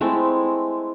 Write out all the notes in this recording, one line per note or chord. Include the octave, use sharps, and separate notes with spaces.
G#3 A3 C4 E4